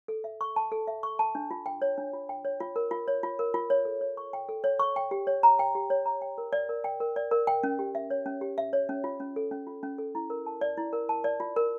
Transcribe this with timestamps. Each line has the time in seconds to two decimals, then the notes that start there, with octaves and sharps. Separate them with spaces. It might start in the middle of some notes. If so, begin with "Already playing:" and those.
0.08 A4
0.24 E5
0.41 C#6
0.56 A5
0.72 A4
0.88 E5
1.03 C#6
1.19 A5
1.35 D4
1.51 F4
1.66 G5
1.82 C#5
1.98 D4
2.13 F4
2.29 G5
2.45 C#5
2.60 F4
2.76 A#4
2.91 F4
3.08 C#5
3.23 F4
3.39 A#4
3.54 F4
3.70 C#5
3.85 A4
4.01 C#5
4.17 C#6
4.33 G5
4.49 A4
4.64 C#5
4.79 C#6
4.96 G5
5.11 G4
5.27 C#5
5.43 A#5
5.59 G5
5.75 G4
5.90 C#5
6.06 A#5
6.22 G5
6.38 A#4
6.53 D5
6.69 A#4
6.84 G5
7.00 A#4
7.16 D5
7.31 A#4
7.47 G5
7.63 C#4
7.79 G4
7.95 E5
8.10 C#5
8.26 C#4
8.41 G4
8.58 E5
8.73 C#5
8.89 C#4
9.04 F4
9.20 C#4
9.36 A4
9.51 C#4
9.67 F4
9.83 C#4
9.98 A4
10.15 E4
10.30 A#4
10.46 A5
10.61 D5
10.77 E4
10.93 A#4
11.09 A5
11.24 D5
11.40 F4
11.56 A#4